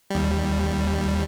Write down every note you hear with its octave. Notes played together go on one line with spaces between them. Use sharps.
D#2 G3